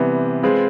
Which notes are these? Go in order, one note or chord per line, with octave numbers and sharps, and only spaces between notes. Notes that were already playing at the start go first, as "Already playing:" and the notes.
Already playing: C3 E3 G3 B3
G#3 C4 F4 G#4 B4